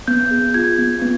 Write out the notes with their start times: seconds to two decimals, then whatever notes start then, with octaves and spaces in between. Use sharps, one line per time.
0.08 B3 G6
0.31 G#4
0.54 F4 G#6
0.78 B3
1.02 B3